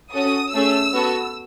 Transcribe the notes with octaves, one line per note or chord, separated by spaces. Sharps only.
C#4 F#4 A4 D#6
A3 C#4 G#4 E6
B3 F#4 A4